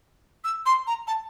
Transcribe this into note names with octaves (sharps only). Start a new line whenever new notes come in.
E6
C6
A#5
A5